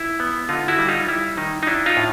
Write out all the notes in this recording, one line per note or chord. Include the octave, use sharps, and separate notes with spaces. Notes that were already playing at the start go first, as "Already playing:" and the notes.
Already playing: E4
B3
D3 D#4 F4
E4 F#4
G3
D#4 F4
G3 E4
D#3 D#4
D#4
D4 E4
D#4 F4
A2